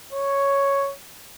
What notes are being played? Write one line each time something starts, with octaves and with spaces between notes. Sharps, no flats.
C#5